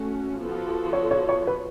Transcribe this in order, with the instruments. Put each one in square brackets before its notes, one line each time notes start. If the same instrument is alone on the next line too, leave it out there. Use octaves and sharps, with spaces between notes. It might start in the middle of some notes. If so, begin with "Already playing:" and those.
Already playing: [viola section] A3 C#4 F#4 A4
F3 B3 F#4 A4
[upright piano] C#5
C#5
C#5
B4